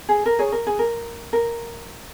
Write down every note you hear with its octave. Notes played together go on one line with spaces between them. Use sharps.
G#4
A#4
G#4 C#5
A#4
G#4
A#4
A#4